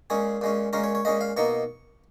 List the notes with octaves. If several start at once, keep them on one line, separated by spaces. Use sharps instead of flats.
A#2 G#3 C#4 G#4
A#2 G#3 C#4
A#2 G#3 C#4 A#4
C#5
C#5
A#2 G#3 C#4 D#5
F5
B2 A#3 D#4 C#6